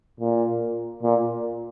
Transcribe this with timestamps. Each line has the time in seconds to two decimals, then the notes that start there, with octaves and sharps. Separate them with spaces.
0.20 A#2
1.03 A#2